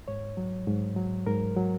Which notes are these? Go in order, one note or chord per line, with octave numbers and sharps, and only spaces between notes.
G#2 C#5
F#3
G#2
F#3
G#2 A#4
F#3